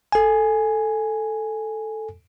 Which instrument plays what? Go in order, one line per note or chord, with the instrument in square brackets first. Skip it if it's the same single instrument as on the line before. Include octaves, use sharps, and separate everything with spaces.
[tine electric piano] A4 G#5